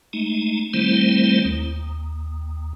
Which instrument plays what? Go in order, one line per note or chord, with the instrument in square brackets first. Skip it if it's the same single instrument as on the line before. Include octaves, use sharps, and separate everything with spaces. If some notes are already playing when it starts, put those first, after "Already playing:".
[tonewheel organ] G#3 A3 D#4
D#3 G3 A3 C4 E4 C5
D#2